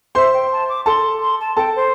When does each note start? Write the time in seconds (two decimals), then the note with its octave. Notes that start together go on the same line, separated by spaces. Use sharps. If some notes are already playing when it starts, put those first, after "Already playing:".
0.15 C5 E5 C6
0.33 G5
0.51 A5
0.68 D6
0.86 A4 A5 C6
1.22 C6
1.40 A5
1.57 A4 G5 A5
1.75 C5